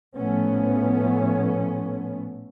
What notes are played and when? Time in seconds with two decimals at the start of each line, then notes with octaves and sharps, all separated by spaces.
0.16 A#1 A2 F3 A3 B3 C#4